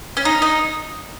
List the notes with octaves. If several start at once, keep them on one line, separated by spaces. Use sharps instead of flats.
C#4
D#4
D#4